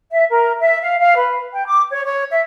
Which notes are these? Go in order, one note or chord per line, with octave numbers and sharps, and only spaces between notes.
E5
A#4
E5
F5
F5
B4
G5
D6
C#5
C#5
E5